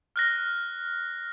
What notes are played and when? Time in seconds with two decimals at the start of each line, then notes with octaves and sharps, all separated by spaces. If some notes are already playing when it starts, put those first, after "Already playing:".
0.16 F6 F#6 A#6